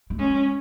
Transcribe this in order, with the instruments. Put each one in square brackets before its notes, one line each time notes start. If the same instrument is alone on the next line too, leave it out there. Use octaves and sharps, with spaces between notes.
[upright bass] A3
[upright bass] G#3 [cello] C#4